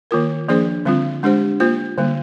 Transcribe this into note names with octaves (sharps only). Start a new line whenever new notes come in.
D#3 A#3 F4 A#4
F3 A#3 D4 G#4 C5
D3 G3 C4 F4
G#3 D4 G4 C5
A#3 F4 C5
D3 G3 A#3